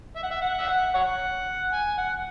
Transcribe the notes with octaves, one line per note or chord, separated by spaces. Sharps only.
E5
F#5
E5
F#5
E5
F#5
C#5 F#5
G#5
F#5